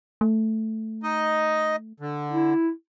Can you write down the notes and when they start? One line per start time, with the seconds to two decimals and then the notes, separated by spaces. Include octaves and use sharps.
0.21 A3
1.03 D#4 D#5
2.00 D3
2.32 E4